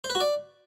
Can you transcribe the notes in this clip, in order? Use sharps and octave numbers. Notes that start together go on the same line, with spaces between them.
C5
B4
F#4
D5